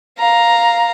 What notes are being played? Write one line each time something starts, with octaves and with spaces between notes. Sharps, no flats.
F5 A#5